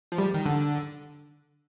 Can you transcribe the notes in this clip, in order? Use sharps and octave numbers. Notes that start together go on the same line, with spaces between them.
F3
G3
D#3
D3